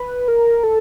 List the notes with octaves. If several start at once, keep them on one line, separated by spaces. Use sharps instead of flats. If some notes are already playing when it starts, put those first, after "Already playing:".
Already playing: B4
A#4
A4